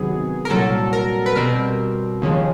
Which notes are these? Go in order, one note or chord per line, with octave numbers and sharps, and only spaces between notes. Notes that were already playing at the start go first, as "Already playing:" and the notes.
Already playing: C3 D#3 F#3 B3 G#4
A#4
C2 A#2 F#3 A4
A#4
B4
B2 G3 C4 A#4
D#2 C#3 F3 G#3